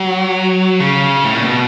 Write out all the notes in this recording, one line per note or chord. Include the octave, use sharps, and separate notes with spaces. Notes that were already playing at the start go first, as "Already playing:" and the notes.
Already playing: F#3
C#3
A2
A#2
B2